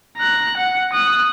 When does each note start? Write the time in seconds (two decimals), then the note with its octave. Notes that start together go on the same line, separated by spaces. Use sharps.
0.17 A#5 F#6
0.57 F#5
0.93 D#6 F#6